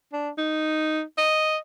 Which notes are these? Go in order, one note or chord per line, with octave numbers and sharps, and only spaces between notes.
D4
D#4
D#5